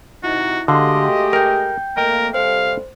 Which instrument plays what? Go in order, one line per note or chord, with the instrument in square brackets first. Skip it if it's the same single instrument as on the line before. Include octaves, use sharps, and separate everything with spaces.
[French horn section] C3 D#4 [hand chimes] E4 [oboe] F#4
[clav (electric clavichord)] D3 [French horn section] G#3 A3 G4 [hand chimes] F#4 F5 C6 [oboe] D#5
[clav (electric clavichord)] A#4 [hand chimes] G5 G6
[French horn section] F2 A3 A#3 [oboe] A#4 [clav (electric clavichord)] D#5 G5
[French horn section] C3 G3 A4 [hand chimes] C5 [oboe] F5